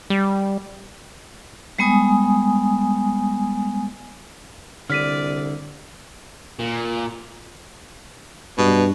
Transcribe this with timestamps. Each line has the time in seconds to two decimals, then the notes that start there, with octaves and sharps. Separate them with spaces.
0.10 G3
1.79 G3 G#3 B3 G#5 D#6
4.90 C2 D3 D5 F6 B6 D#7
6.59 A#2
8.58 G2 B2